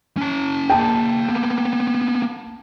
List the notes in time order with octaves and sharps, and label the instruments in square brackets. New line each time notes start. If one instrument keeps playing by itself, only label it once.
[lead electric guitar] C#4 A5
[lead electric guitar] A#3 G#4 [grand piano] G5 A5
[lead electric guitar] A#3 B3